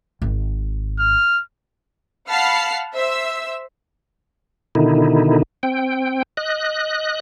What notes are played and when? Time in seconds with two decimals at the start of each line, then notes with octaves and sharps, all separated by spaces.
0.22 G#1
0.99 F6
2.29 F5 F#5 A5 B5 F6 C7
2.94 C5 E5 E6
4.75 B2 D3 D#3 D#4 E4
5.63 C4 G5
6.37 D#5 F#6